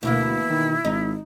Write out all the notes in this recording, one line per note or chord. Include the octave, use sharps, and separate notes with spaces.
D2 B2 E3 A#3 E4
D#3
G#1 D#4